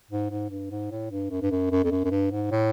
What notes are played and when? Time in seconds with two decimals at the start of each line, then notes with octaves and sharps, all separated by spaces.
0.10 G#2
0.30 G#2
0.50 G2
0.71 G#2
0.91 A2
1.11 G2
1.31 F#2
1.42 G2
1.51 F#2
1.71 F#2
1.84 F2
1.91 F#2
2.04 F#2
2.11 G2
2.31 G#2
2.51 A2